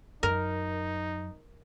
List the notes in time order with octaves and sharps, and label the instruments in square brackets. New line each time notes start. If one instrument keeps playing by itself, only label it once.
[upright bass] F#2 [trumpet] D#4 [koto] A#4